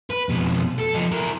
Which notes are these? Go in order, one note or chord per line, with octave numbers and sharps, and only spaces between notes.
B4
F2 B2
A4
F3 D#4
E4 A#4